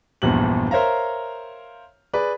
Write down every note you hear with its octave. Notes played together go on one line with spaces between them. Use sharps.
A#1 E2 G2 G4 F#7
A#4 C5 C#5 E5 F5 A#5
G#4 B4 D5